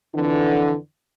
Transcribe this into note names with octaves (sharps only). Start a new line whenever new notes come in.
F2 D3 E3